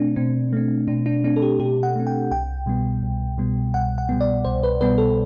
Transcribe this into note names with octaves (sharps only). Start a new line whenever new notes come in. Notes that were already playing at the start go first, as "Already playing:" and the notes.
Already playing: B2 A3 C4 D4
B2 C4
A3 C4
B2 D4
D4
A3 C4 D4
A4
G4
B2 G4
F#5
A3 C4
G5
C2 G5
B2 G3 B3
C2
B2 G3 B3
C2 F#5
F#5
B2 G3 B3
D5
C2 C5
B4
B2 G3 B3 B4
A4